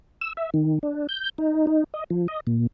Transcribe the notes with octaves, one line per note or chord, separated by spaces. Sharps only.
E6
E5
D#3
D4
G6
D#4
D#4
D#5
F3
D#5
A#2